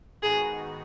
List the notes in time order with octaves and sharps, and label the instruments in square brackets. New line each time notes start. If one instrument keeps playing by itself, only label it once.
[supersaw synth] G#2 D#3 B3 D#4 F#4 [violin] G#4